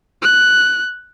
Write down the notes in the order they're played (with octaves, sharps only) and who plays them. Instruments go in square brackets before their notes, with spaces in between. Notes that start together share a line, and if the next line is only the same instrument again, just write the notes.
[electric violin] F#6